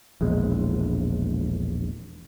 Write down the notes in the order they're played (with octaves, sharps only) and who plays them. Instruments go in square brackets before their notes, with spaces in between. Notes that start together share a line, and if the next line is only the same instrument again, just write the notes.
[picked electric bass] E1 A#1 G#3